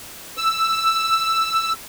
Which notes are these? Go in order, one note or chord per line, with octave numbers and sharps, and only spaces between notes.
E6